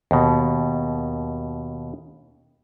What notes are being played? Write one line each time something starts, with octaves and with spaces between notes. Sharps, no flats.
D#2 B2